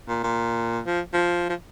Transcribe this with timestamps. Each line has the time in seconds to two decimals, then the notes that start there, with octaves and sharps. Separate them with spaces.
0.08 A#2
0.24 A#2
0.87 F3
1.14 F3
1.49 F3